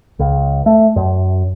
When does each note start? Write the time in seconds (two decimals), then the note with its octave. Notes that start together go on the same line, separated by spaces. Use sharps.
0.19 C#2
0.66 A3
0.96 F#2